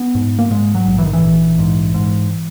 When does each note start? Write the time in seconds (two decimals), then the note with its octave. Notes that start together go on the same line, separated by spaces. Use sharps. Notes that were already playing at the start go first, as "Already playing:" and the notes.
Already playing: B3
0.15 G#2
0.39 A#3
0.51 G#2 G#3
0.75 F#3
0.87 A#1
0.98 E3
1.06 D#3
1.13 E3
1.22 A#1
1.59 G#2
1.94 G#2